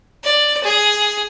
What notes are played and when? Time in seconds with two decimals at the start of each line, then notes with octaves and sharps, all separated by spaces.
0.24 D5
0.63 G#4